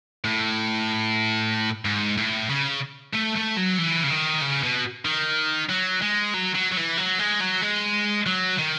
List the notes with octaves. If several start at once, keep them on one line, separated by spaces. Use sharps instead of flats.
A2
G#2
A2
C#3
A3
A3
F#3
E3
C#3
D#3
C#3
B2
D#3
F#3
G#3
F#3
F#3
F#3
E3
F#3
G#3
F#3
G#3
F#3
D#3